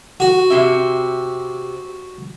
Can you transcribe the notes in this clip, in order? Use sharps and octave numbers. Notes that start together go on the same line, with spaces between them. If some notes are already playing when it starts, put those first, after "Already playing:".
F#4
C3 G4 E5